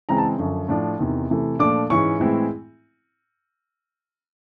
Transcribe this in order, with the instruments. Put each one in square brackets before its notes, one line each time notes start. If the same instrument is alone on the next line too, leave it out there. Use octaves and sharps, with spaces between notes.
[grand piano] C#3 E3 G#3 C4 A#5
A5
F#2 D3 F3
A2 F3 A3 D4
E2 C3 D#3
C3 E3 A3
A#2 F3 A3 D4 D6
G#2 E3 G#3 C#4 C#6
A2 E3 G#3 C4 E4